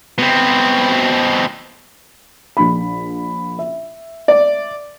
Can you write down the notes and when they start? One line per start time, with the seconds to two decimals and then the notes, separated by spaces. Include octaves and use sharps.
0.19 B2 C4
2.57 A#1 D4 B5
3.59 E5
4.28 D5